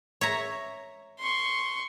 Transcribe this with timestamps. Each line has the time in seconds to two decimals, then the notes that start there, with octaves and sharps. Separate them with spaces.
0.21 C#5 E5 A#5
1.19 C6 C#6